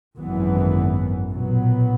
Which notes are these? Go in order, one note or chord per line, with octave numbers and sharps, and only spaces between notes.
G#1 F#2 E3 B3
B1 A#2 F#3 B3